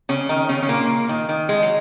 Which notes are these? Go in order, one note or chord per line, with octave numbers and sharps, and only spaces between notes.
C#3 C#4
D#3 D#4
C#3 C#4
C#4
A#2 A#3
D#3
D#3
G#3
F#3